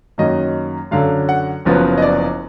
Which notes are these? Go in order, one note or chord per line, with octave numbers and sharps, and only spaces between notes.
F#2 D#3 F#3 A#3 D#5
F#2 D3 F#3 F5
F#5
F#1 F#2 F3 B3
D#5
D5